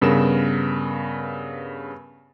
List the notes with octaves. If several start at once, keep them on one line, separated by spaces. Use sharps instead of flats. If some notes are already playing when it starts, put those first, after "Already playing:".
G2 C#3 B3 A#4 E7